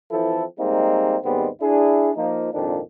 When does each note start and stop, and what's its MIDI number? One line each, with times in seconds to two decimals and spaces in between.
0.11 0.44 52
0.11 0.44 53
0.11 0.44 60
0.11 0.44 64
0.11 0.44 69
0.58 1.17 55
0.58 1.17 56
0.58 1.17 58
0.58 1.17 60
0.58 1.17 63
1.23 1.48 39
1.23 1.48 44
1.23 1.48 55
1.23 1.48 56
1.23 1.48 59
1.23 1.48 60
1.62 2.12 62
1.62 2.12 64
1.62 2.12 68
2.16 2.50 53
2.16 2.50 58
2.16 2.50 63
2.53 2.79 32
2.53 2.79 41
2.53 2.79 46
2.53 2.79 51
2.53 2.79 62